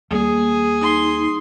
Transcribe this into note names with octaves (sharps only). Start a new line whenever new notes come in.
D#2 G3 A#3 G#4
D#4 C6